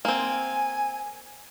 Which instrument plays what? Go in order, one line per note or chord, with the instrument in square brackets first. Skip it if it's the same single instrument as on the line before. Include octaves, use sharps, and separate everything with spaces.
[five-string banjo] A#3 C4 [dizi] G#5